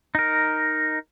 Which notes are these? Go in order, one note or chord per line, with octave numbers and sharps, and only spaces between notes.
D#4 A#4